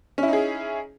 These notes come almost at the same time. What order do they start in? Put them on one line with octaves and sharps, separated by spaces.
C#4 E4 D#4 G#4